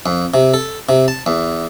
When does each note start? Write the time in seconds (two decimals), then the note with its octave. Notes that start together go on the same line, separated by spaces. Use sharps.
0.06 F2
0.34 C3
0.54 A4
0.89 C3
1.08 A5
1.26 E2